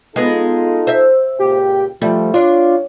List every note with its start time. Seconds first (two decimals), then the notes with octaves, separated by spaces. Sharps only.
0.16 G#3 B3 D#4 F4 A4
0.87 C5 E5
1.39 C#2 A#2 G4 G5
2.02 F3 G3 A3
2.34 D4 F4 C#5